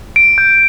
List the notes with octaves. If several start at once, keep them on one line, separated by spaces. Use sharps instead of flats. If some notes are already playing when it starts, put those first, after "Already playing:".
D7
G6